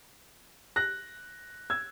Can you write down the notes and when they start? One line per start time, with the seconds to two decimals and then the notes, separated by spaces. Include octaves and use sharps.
0.76 F#6 A#6
1.70 E6 G#6